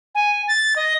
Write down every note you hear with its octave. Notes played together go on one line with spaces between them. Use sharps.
G#5
A6
D#5